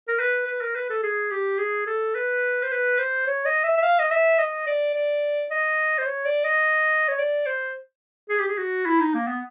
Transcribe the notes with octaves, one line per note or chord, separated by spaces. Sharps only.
A#4
B4
B4
A#4
B4
A4
G#4
G4
G#4
A4
B4
C5
B4
C5
C#5
D#5
E5
E5
F5
D#5
E5
D#5
D5
D5
D#5
C5
C#5
D5
D#5
C#5
D5
C5
G#4
G4
G#4
F#4
E4
D#4
A#3
B3